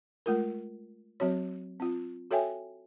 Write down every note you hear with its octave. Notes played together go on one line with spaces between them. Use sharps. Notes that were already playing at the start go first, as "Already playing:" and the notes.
G#3 A3 F4 A#4
F#3 C4 F#4 C#5
C4 F4
F#4 A4 C#5 E5 G5 G#5